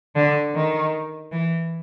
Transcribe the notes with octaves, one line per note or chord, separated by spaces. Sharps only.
D3
D#3
E3